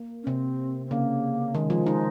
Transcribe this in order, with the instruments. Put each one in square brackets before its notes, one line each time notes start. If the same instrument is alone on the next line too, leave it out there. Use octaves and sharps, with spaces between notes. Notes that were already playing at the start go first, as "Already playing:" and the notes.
Already playing: [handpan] A#3
[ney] C#4
[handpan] C3 [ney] C4
[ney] C4
[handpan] C#3 [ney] A#3
[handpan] D#3 [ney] G#3
[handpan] F3
D#4